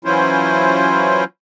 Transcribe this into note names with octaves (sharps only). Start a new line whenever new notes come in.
E3 F#3 C#4 E4 F4 C5